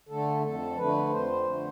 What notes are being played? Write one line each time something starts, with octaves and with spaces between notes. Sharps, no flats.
D3 A3 A4
F2 A4
D3 A3 B4
F2 C5
D3 A3